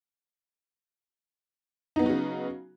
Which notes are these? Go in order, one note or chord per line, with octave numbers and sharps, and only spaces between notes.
C#3 F#3 B3 D#4 F#4